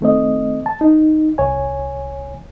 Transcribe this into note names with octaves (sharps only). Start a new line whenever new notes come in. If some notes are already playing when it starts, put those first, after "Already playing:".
D#3 A3 C4 D#5
A5
D#4
C2 C#5 G#5